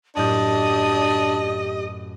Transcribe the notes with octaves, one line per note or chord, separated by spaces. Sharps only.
F#2 A2 D4 G4 D#5 G6